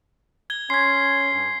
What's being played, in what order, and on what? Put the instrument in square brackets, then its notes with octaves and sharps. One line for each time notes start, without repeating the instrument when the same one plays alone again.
[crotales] G#6 G7
[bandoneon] C#4 [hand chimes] C6 G#6 [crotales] B6 C7
[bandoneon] G2